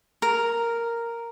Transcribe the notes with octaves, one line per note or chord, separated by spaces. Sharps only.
A#4